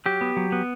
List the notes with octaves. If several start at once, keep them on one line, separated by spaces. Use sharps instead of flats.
F#3 G4
B3
F#3
B3